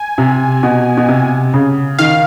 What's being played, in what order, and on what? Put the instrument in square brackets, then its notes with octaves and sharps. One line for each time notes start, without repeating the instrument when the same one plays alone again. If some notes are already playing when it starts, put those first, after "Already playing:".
Already playing: [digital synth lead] G#5
[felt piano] C3
B2
B2
C3
C#3
[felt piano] D#3 [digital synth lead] F5